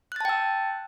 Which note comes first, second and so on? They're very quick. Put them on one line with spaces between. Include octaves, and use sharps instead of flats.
F#6 A6 A5 G5 E6